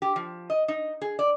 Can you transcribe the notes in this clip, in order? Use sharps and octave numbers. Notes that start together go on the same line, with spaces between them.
G4
F3
D#5
D#4
G#4
D5